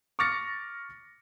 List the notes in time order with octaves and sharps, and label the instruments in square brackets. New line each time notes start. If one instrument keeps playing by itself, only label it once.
[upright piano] C#6 D6 F6 A6 A#6 C#7